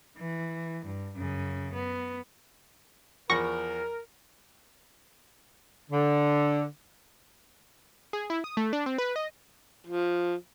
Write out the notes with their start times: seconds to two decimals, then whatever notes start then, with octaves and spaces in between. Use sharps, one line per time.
0.17 E3
0.86 G2
1.16 F#2 C#3
1.74 B3
3.30 E2 F3 A#4 B5 C#6 A#6
5.91 D3
8.13 G#4
8.30 E4
8.44 D#6
8.57 A3
8.73 D4
8.86 C4
8.98 B4
9.16 D#5
9.87 F3